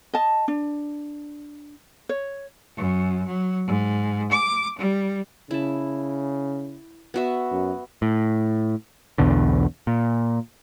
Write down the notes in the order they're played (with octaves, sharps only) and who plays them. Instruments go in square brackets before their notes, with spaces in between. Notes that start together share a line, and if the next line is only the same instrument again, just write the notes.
[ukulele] D#5 A5
D4
C#5
[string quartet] F#2
F#3
G#2
D6
G3
[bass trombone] C#3 [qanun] E4 A5
[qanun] B3 F#4 E5
[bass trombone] F#2
[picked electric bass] A2
B1 E2 B2 D3
A#2